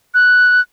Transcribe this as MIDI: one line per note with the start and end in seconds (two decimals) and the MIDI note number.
0.14 0.61 90